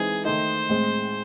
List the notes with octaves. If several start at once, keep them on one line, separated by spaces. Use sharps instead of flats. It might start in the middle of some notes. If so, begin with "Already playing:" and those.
Already playing: E3 G#3 C4 D#4 G#4
D#3 A3 D#4 C5
A2 G#3 C4